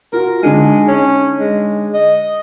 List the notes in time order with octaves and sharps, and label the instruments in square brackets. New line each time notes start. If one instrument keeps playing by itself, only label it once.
[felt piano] F4 F#4 [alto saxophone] A#4
[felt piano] D3 D4 D#4 [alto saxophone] G#3
[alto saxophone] C#4
G#3
D#5